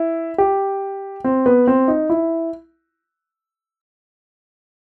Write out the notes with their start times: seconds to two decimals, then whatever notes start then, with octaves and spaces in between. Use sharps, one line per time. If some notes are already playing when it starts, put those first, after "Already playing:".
Already playing: E4
0.38 G4
1.24 C4
1.46 B3
1.67 C4
1.88 D#4
2.10 E4